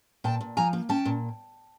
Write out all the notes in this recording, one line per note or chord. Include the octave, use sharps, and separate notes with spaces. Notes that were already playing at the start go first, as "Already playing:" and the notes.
A#2 G5 A5
A#2
F3 G#5 A#5
A#3
C#4 G5 A5
A#2